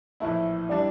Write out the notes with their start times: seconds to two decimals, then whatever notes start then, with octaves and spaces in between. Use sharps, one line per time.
0.20 A#1 A2 E3 A3 E4 E5
0.69 E3 G3 D4 D5